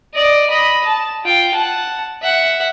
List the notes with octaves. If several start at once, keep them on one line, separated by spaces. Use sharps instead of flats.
D5 D#5
D#5 B5
A5
F4 G5
F#5 A5
E5 F#5